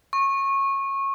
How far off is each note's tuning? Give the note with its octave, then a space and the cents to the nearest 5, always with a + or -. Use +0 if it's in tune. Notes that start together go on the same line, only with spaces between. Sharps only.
C#6 -20